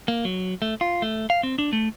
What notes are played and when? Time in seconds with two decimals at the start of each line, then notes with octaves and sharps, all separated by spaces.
0.08 A#3
0.25 F#3
0.62 A3
0.81 F4
1.02 A3
1.30 F5
1.43 C4
1.59 D4
1.73 A3